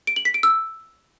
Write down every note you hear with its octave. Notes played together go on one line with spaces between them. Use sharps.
D7
F#7
B6
D7
E6